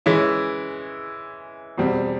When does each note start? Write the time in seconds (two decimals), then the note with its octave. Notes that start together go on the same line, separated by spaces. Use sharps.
0.06 E3 G#3 C#4 E4
1.78 E2 B2 G3 C4